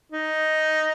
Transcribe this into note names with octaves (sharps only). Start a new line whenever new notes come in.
D#4